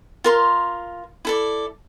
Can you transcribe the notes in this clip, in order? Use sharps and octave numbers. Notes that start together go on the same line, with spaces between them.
F4 A#4 C6
E4 A4 D5